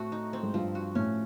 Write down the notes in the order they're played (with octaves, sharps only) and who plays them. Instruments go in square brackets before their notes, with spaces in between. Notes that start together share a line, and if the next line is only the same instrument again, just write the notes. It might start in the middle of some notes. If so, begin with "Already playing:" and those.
Already playing: [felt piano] A2 [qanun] A3 C4 F#4
[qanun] D#4
C4
[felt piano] G#2
[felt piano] G2 [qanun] F3
[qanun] F#4
[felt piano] A2 [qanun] C#4